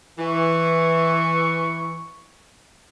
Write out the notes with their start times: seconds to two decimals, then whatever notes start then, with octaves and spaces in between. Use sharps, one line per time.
0.19 E3 C#6